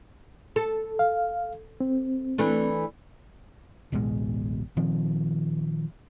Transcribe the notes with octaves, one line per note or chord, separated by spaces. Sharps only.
A4
F5
C4
E3 A3 D4
D1 A1 B2 G#3
A#2 D#3 F3 C4